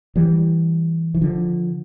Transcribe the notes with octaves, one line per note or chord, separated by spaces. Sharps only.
E3 G3
E3
D3 F3